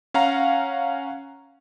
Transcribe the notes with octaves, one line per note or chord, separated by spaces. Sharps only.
C#4 F5 F#5 A#5